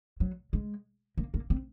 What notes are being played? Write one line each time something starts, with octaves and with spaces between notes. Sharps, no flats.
F#3
G#3
A#3
A#3
C4